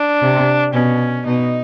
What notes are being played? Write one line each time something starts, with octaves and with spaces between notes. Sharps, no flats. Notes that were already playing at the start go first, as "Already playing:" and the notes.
Already playing: D4
C3
B2 C#4
B2 D#4